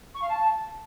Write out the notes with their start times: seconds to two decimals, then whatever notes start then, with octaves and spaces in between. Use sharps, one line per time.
0.14 C#6
0.21 F5
0.29 A5